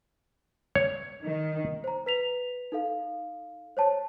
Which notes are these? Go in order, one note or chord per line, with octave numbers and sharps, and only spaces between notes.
C#5
D#3
C5 A#5
B4 B6 F7
D#4 A4 F5
C5 C#5 A5